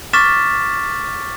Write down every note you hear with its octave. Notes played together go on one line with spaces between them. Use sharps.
C#6 D6 F6 A6 B6 E7